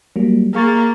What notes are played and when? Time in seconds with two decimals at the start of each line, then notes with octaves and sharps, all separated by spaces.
0.16 F#3 G3 A#3
0.54 A#3 G#4 C#6 A6